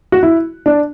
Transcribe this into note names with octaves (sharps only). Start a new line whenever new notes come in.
F#4
E4
D4